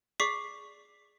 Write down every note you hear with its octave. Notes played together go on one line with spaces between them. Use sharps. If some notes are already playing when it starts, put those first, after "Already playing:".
G#4 D5 C#6 D6 B6 C7